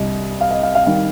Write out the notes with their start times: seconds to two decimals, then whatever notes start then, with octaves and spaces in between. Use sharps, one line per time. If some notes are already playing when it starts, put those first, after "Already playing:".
Already playing: C2 C3 G3 D#5
0.41 F5
0.51 D#5
0.63 F5
0.75 F5
0.86 D#3 G3 F5